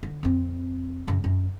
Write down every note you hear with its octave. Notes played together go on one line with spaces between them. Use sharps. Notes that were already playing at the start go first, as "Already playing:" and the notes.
D3
F2 C4
F#2 C#3
F#2